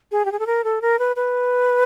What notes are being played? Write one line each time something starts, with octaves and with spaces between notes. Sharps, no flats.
G#4
G4
G#4
A4
A#4
A4
A#4
B4
B4